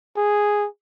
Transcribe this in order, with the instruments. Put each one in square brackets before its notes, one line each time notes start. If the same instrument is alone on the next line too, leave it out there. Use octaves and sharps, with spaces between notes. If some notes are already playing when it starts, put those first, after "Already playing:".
[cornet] G#4